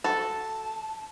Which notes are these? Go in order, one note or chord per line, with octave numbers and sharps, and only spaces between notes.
F#4 A4 A5